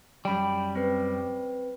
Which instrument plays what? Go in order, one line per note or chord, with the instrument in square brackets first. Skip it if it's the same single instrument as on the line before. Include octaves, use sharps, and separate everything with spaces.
[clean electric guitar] F#2 G3 [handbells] G5 B5
[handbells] C4 B4